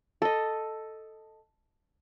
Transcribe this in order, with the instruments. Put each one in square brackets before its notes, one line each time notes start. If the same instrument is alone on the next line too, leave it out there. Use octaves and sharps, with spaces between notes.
[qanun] A4 D#5